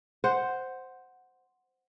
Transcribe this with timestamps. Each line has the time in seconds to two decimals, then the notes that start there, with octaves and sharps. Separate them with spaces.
0.24 C5 F#5